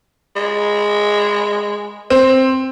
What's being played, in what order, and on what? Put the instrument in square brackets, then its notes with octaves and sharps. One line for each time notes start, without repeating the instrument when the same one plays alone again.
[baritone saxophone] G#3
[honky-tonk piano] C4